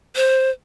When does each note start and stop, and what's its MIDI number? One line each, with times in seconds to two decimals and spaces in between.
0.16 0.50 72